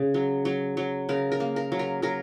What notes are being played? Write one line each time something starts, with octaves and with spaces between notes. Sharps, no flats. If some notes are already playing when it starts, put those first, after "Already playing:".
Already playing: C#3
F#3
F#3
F#3
C#3 A#4
A#4
A#3
A#4
F#3
A#4
F#3 A#4